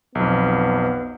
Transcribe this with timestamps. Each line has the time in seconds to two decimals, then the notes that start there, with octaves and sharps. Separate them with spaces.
0.15 B1 F2 B3